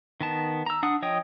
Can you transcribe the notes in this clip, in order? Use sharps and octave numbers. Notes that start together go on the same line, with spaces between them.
D#3 B3 A5
A#5 E6
D4 F#5 D#6
F3 C#5 D#5 G5 D#6